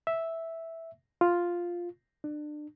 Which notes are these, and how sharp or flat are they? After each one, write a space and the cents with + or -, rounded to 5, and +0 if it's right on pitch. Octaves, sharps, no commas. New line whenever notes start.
E5 -5
F4 +0
D4 +30